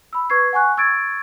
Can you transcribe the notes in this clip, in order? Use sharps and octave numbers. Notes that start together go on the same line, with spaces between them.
B5 E6
B4 C#6 G#6 C7
F#5 G#5 C#6 F#6
C#6 E6 G#6 A6 D7